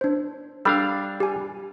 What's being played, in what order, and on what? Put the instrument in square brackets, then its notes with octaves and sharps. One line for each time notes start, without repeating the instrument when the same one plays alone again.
[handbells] D4 C5
[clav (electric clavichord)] G3 D4 F5 [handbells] A4 B5 E6
[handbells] G4 G#5